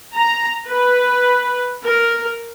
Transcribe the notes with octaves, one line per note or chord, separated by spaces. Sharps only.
A#5
B4
A#4